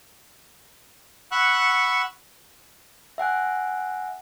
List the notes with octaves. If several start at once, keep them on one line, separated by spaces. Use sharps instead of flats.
F#5 B5 C#6 E6 F#6
E5 F#5 G#5 F#6